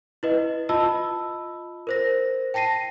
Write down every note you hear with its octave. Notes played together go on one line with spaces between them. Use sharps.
E4 B4 D#5
F4 D#5 A5 B5 E6
A#4 C5 A#6
G5 A5 A#6 C7 D#7